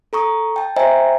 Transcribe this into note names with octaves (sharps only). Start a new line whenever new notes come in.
A4 A#5 C#6 D#6
G5 A5
C5 D#5 E5 G5 G#5 A#5